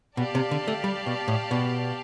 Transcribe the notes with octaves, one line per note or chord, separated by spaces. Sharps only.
B2 G4 D5 F5 A5
C3
D3
A3
G3
B2
A2
B2